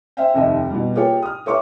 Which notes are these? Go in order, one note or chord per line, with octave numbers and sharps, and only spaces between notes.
C5 E5 F5 G5
F1 D#2 D#5 E5
B2 G3
A#3 F4 G4 G#4 C#5 G5
D#6 F6
G4 A4 C#5 E5 C#6 D6